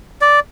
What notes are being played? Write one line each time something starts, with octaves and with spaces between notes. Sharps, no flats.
D5